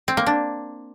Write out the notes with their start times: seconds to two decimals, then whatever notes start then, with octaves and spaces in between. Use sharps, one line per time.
0.08 C4
0.17 A#3
0.26 D4